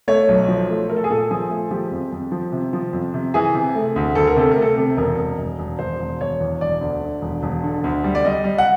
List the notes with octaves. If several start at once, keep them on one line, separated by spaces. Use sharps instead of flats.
A3 C#5
B1
F3
A3
A3 A#4
A4
G#4
A#2 A4
F3 G#4
A3
F3 G4
F2
F2
F3
C3
F3
F2
C3
E3 G#4
C3
A3
D2
D2 A4
A#4
C3 A4
A3 A#4
A4
C3
E1 A#4
E1
E1
E1
E1 C5
E1
E1 C#5
E2
E1 D5
D2
D3
E1
E1
D3
D2
G3
D5
G3 D#5
G3
F#5